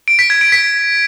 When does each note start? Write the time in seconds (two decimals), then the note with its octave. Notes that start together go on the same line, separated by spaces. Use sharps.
0.08 D7
0.19 B6
0.30 G#6
0.41 D7
0.52 B6